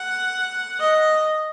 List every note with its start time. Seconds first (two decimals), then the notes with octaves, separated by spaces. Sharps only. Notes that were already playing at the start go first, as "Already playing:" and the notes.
Already playing: F#5
0.80 D#5